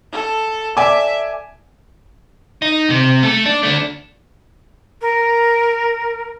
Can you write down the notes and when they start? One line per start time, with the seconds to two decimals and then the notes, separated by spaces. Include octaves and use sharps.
0.12 A4
0.77 D5 E5 G#5 D6
2.62 D#4
2.90 C3
3.23 A3 A4
3.46 D4
3.63 A3 D4
5.01 A#4